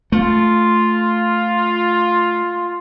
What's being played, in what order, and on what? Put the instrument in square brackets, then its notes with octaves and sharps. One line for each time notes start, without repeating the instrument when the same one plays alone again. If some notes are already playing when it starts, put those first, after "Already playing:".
[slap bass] A3 [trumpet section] F4